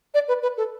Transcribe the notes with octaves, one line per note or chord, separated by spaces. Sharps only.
D5
B4
B4
A4